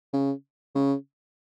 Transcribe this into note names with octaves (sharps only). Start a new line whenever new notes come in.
C#3
C#3